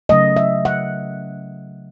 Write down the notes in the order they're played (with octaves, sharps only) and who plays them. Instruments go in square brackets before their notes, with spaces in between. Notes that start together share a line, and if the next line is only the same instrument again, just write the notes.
[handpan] C#3 F#3 A3 D#5
E5
F#5